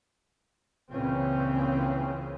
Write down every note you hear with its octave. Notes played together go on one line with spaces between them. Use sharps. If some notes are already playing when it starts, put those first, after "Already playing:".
C#2 A#2 C#3 E3 C4 C#4